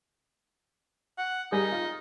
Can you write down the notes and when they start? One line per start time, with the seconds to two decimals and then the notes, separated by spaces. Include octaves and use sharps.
1.18 F#5
1.52 G3 D#4 G#4 A#4
1.72 F4